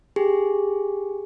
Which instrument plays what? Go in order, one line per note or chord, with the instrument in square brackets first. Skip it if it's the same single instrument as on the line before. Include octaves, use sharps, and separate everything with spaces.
[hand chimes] G4 G#4